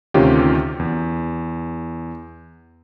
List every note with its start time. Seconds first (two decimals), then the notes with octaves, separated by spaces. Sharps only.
0.14 D2 C3 D#3 C#4 F4 G4
0.79 E2